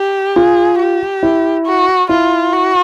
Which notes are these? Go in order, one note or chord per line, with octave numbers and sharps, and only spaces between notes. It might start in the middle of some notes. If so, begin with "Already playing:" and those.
Already playing: G4
F4 G#4
G4
E4
F#4
E4 F4
F#4